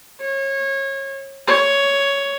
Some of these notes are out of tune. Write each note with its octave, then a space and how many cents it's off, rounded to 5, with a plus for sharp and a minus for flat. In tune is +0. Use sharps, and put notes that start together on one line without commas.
C#5 -25
C#5 +10